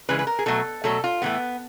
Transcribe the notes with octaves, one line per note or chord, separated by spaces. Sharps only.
C#3 E3 G#3 B4
B4
A#4
G#4
B2 F#3 A3 A4
B2 F#3 A3 A4
F4
A2 E3 A3 B3